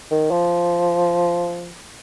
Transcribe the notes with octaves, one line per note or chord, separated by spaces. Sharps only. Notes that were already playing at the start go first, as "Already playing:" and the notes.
D#3
F3